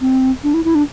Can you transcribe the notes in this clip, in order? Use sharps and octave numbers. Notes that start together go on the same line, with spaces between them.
C4
D4
E4
E4
D4